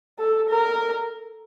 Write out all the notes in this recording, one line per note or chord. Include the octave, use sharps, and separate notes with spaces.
A4
A#4